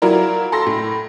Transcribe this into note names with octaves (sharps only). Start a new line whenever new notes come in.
F#3 E4 F4 A#4 D5
A4 C6 A#6
A2